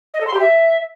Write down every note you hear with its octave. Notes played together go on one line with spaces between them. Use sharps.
D#5
A4
C6
G4
E5